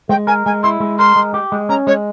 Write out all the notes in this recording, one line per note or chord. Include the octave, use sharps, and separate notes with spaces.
G#3 G5
A#4 G#5
G#3 G#5
E4 C6
G#3
A#4 C6
G#3
G4
G#3
C#4 A#5
G#3 C#5